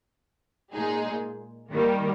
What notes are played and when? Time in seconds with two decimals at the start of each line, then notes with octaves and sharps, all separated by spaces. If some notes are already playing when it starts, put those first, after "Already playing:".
0.73 A#2 G#3 D#4 G#4
1.72 D#3 G3 A#3